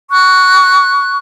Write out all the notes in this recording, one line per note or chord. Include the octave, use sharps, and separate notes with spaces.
C#6 F#6